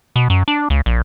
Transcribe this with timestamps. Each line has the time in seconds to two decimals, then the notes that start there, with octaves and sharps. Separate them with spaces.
0.16 B2
0.30 F#2
0.48 D4
0.70 C#2
0.86 A#1